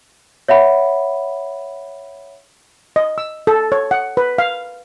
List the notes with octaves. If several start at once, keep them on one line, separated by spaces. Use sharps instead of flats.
C#5 E5 F#5 B5
D#5
E6
A4
C#5
F#5
B4
F5